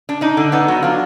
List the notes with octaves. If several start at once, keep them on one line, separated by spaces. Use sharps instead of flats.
D4
D4 D#4
D3
B3 D#4
F#3
D4 F4